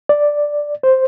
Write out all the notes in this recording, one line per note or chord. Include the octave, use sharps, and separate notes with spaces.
D5
C5